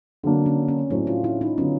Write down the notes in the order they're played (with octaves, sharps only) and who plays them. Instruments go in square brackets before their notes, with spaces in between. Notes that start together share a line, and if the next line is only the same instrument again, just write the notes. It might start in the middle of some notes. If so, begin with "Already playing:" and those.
[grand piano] D3 F#3 A#3 D4 [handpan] C4
[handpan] C#4
C#4
[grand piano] A2 F#3 A3 C4 [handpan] D4
[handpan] F4
E4
D#4
[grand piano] D3 F#3 B3 [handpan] C#4